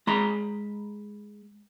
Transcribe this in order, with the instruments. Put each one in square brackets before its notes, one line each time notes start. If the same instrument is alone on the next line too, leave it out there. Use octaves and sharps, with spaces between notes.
[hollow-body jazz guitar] G#3 A#5 B5